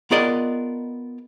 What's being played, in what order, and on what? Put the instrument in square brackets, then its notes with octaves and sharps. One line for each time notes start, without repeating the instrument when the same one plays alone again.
[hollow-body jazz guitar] B3 F4 G#4 A#4 D5 D#5